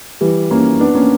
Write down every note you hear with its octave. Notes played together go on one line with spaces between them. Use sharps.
E3 G3
A#3 C#4
B3 D4
A#3 C#4